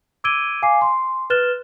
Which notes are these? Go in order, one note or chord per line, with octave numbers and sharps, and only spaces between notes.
D6 E6 G#6 D7 D#7 G7
F5 G#5 D6 C7
C6
B4 F6 F#6 A6 E7 G7